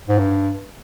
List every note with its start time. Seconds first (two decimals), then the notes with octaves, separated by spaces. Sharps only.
0.09 G#2
0.18 G2